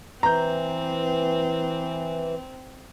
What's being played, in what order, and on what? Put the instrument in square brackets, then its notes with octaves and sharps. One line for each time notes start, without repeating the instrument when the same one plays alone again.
[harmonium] E3 [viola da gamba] C4 [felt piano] A#5 G6